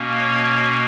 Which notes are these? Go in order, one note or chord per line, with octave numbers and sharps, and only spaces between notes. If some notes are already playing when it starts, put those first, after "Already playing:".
Already playing: B2 A#3 C#4
C#5